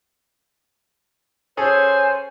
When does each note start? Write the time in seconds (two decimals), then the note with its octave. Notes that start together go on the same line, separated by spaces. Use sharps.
1.57 C#4 G#4 A4 C5 G#5